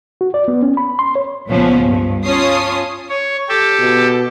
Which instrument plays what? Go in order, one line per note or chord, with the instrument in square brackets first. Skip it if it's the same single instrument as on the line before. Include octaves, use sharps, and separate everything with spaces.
[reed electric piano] F#4
D5
B3
C#4
B5
C6
C#5
[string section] C#2 A#2 F3 B3 C#4
G2
C#4 F4 C#5 A5 D#6 C7
[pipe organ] C#5
G4 A4
[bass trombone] B2